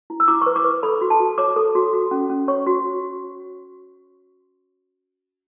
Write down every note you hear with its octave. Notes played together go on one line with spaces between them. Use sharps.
E4
E6
E4 D6
C#6
B4
D6
B4
A4 B5
F#4
A5
F#4
C#5 D6
A4
F#4
F#4
C#4
C#4
C#5 C#6
F#4